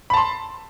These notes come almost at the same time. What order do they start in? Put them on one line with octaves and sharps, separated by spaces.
B5 A5 C6